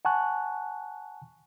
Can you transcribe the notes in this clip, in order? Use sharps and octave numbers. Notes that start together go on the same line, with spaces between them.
F#5 G#5 A5 C#6 F#6